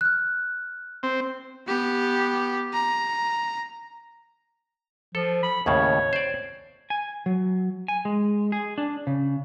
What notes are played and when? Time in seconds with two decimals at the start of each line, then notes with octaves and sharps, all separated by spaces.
0.01 F6 F#6
1.03 C4
1.67 B3 G4
2.73 A#5
5.15 F3 A4
5.43 B5
5.66 D#2 A2 C#3 C#5
6.13 C5 D5
6.90 G#5
7.26 F#3
7.88 G#5
8.05 G#3
8.52 G#4
8.78 D4
9.07 C#3